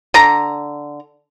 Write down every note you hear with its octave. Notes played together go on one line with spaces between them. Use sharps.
D3 A#5